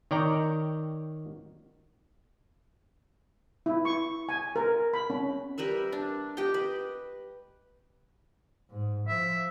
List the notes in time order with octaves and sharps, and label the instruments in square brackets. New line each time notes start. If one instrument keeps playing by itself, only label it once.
[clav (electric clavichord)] D#3 C#5 D5 G5 A#5
[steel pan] E4
C#6
G#5
A#4
B5
C#4
[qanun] G3 A#4 B4 E5
D4
G4 D#5 G5
B4
[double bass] G#2
[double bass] F3 [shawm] E5